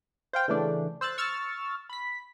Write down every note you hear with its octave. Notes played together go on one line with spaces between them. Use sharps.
C5 F5 G5
C#3 E3 A3 D4
C5 E6 F#6 A6
C#6 E6 F6 A6
B5 B6